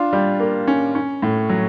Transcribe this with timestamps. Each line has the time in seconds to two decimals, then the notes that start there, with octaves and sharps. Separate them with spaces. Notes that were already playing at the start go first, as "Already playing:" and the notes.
Already playing: D4 F4
0.13 G3
0.40 A#3
0.67 C#4
0.95 C#4
1.22 A2
1.49 F#3